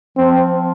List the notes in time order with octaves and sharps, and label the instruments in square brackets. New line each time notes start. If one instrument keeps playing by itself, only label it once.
[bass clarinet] F3 [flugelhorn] C4